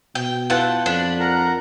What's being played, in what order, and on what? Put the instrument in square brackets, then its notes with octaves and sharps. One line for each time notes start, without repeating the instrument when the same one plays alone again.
[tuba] B2 [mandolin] G5
[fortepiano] E4 F4 B4 [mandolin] F#5 G5 A5
[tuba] F2 [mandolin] D4 [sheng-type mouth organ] A5 B5
[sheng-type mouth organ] A#4 F#5 A#5